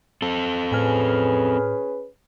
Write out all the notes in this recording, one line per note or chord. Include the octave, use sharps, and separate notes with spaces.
C4 A4
A2 C#4 G#4 B4 G#5 F6